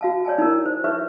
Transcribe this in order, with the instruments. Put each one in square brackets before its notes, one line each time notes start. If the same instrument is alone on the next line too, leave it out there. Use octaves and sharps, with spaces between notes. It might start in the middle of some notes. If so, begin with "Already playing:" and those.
[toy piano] F#4 F5 A5
C#5 D5 G#5 A5
D#4 E4 A#4
C5
D#4 B4 C#5 E5 C#6